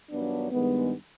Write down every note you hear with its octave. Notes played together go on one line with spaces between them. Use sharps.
G2 D#3 F#3 B3 D4
G2 D#3 G#3 B3